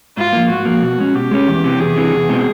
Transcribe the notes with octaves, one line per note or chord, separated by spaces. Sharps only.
G#2 F4
F3 A#3
G#2 F#4
F3 A#3
B2
G#3 C#4
B2 G4
G#3 C#4
E2
C3 E3
E2 G#4
C3 E3
E2
B2 G#3 C4